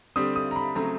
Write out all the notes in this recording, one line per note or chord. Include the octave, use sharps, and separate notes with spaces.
D3 G3 C4 D#6
D#6
A#5
B5
C#3 F#3 A3 C4 A#5